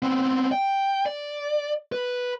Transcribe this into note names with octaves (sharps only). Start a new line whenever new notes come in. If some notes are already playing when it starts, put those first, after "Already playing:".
B3 C4
G5
D5
B4